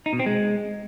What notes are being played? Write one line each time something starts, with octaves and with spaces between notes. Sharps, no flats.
D#4
B2
C4
G#3